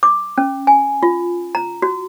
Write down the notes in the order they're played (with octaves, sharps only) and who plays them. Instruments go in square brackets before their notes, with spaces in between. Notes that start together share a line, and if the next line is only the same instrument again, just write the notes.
[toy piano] D6
C#4
G#5
F4
A#5
F#4